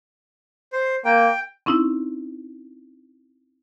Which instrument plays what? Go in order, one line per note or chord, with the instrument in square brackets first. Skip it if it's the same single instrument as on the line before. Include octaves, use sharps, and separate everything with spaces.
[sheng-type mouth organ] C5
[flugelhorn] A#3 [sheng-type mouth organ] G5
[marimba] C4 C#4 D#4 E4